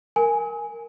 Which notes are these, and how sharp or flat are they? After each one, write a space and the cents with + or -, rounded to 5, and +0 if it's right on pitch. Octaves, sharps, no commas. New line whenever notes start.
A#4 +0 G#5 +0